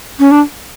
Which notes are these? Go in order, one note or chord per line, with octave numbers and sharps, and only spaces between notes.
C#4
D4